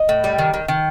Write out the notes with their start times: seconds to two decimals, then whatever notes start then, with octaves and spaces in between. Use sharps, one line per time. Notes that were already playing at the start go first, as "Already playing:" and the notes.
Already playing: D#5
0.09 A2
0.24 G3
0.38 D#3
0.54 D#3
0.68 D#3